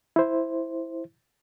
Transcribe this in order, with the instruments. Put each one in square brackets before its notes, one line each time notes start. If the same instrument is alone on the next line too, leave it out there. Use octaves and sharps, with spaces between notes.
[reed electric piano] E4 C5